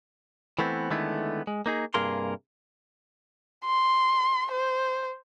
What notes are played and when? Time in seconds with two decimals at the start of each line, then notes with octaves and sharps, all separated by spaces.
0.59 E3 A3 B3 C4
0.90 D3 D#3 G#3 A3 B3 E4
1.47 G#3
1.66 A#3 D#4 G#4
1.94 G2 C3 A#3 G#4 A#4 C6
3.65 C6
4.52 C5